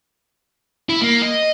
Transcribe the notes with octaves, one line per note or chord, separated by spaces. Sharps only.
E4
A#3
D#5